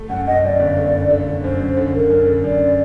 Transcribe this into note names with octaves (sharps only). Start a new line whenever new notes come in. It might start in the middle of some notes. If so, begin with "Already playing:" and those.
Already playing: A3
F#2 F#5
F#2 D#5
F#2 D5
G1
A3
G1
D3
D3
F#2 C5
F#2
D3
D3 A#4
F#2
D3
F#2 D5